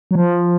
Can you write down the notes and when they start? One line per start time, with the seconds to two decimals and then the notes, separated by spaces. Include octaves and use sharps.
0.11 F#3
0.15 F3